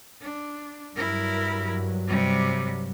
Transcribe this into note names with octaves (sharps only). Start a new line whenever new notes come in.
D4
G2 F#3 E4 A#4
C3 G3